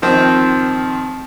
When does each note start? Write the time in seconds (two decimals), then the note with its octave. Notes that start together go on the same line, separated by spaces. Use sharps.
0.02 D#3 F3 C4